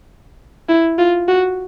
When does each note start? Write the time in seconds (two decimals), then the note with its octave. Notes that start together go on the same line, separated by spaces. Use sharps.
0.69 E4
0.99 F4
1.28 F#4